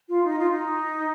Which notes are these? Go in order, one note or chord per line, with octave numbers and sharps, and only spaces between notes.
F4
D#4
F4
D#4